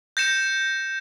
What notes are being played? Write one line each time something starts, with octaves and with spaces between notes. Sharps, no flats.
G6 A#6 C#7 E7